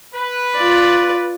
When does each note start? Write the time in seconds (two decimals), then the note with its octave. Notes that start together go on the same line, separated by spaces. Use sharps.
0.15 B4
0.56 F4 D5